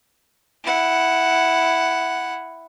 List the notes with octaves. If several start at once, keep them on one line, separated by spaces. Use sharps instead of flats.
E4 F#5